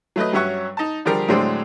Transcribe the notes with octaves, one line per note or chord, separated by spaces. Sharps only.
F#3 A3 B4 D#5
G2 F#3 C#4 E5 F#5 C#6
D#4 A5
D3 F3 G3 G4 G#4 A#4
A2 D3 F#3 G#3 C4 D4